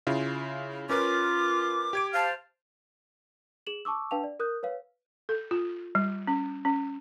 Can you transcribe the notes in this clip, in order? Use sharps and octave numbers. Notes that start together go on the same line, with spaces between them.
C#3 E4 F4
C#4 F4 A#4 B4 D6
G4 G#6 D7
C5 F5 A5 F6
G#4 E7 F#7
A5 C#6 D6 E6
D4 B4 F5 G5 A5 F7
D5
A#4 D#6 F#6 G6
B4 C#5 F5
A4
F4
G3
C#4
C#4